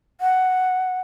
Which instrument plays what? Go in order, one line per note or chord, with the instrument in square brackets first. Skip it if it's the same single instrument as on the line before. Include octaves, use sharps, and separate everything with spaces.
[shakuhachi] F#5